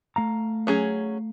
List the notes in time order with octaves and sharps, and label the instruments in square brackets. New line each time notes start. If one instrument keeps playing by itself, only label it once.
[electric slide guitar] A3 F5 A#5
[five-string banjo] F#3 C#4 G#4